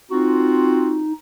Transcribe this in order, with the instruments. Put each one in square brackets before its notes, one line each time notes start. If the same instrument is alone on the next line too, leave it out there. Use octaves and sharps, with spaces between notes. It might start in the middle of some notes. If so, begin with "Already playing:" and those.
[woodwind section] C4 F4 F#4 [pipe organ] D#4